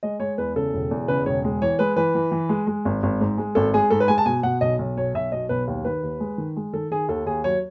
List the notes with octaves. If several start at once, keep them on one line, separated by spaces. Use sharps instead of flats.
G#3 D#5
G#3 C#5
E2 B4
C#3 A4
E1
E2
C#3 B4
E1 C#5
G#3
E3 C#5
G#3 B4
E3 B4
E3
E3
G#3
G#3
G#1
G#1
G#2
G#3
G#1 A4
G#3 G#4
G#2 A4
B4
G#3 G#5
A5
B2 G#5
B2 F#5
B1 D#5
B1
B2 C#5
B1 E5
B2 D#5
B1 B4
D#2
D#3 B4
D#2
G#3
D#3
G#3
D#3 A4
D#3 G#4
D#2 A4
D#2 G#4
F#3 C#5